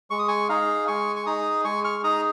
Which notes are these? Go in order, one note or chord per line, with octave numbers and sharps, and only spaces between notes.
G#3 C#6
D#6
G#5 C#6
D#4 G#4 F5 A#5
G#3 G#5 C#6
C#6
D#4 G#4 A#5 D#6
G#3 G#5 C#6
C#6 F6
D#4 G#4 A#5 D#6